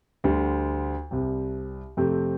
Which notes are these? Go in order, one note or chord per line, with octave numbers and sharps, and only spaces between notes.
D2 D3 G3
C2 C3 G3
F2 C3 A3 C4